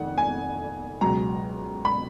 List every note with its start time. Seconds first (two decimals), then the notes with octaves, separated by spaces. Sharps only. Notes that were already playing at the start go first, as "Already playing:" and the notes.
Already playing: F1 F2 D#3 F#5
0.18 G#5
1.01 C#2 B2 F#3 A#5
1.85 B5